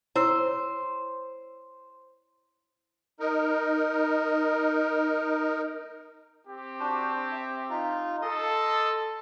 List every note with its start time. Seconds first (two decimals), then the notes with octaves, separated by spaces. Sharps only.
0.16 E4 C5 C#5 E6
3.20 D#4 A#4
6.46 C4 G4
6.80 D4 F#4 C5
7.32 E5
7.70 D#4 F4
8.22 A4 D#5 C6 D#6